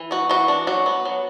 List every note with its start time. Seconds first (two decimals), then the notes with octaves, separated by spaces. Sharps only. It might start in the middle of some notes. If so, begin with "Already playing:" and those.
Already playing: E3
0.11 B3 F#4
0.30 E3 F#4
0.48 D4
0.67 F#3 F#4
0.86 B3
1.05 F#3